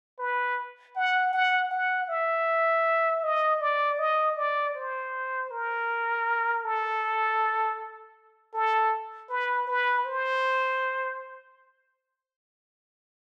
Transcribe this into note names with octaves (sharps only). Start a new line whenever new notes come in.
B4
F#5
F#5
F#5
E5
D#5
D5
D#5
D5
C5
A#4
A4
A4
B4
B4
C5